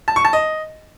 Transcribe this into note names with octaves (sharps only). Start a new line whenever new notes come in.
A5
C#6
A5
D#5